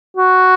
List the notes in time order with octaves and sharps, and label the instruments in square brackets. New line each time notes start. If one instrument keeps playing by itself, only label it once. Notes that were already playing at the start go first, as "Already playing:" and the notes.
[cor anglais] F#4